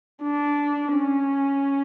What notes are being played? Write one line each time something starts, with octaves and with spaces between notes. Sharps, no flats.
D4
C#4